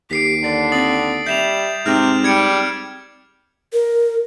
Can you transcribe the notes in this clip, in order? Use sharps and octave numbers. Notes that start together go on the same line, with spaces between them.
D#2 G4 B6 C7 D7
D3 D5
C4 D#6 A6 F#7
G3 E5 G6 E7 F7
G#2 C3 C4 F6 G6
G3 G#6 C#7 D7
A#4